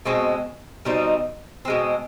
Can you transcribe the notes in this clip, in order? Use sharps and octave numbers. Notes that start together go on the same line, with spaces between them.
B2 G#3 C4
B2 G3 C4 D#4
B2 G#3 C4